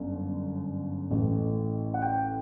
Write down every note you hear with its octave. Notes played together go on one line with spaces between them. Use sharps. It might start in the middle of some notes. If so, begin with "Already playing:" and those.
Already playing: G1 F#2
A1 A2 E3
F#5
G5